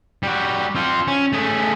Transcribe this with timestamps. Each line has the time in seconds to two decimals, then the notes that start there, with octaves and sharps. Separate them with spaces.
0.23 G3 F#4
0.75 C4 F4
1.08 C#4
1.33 A3 G#4